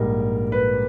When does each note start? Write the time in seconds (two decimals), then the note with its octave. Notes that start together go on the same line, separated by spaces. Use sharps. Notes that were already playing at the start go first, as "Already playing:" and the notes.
Already playing: A#1 G#2 G3 A#3 A#4
0.52 B4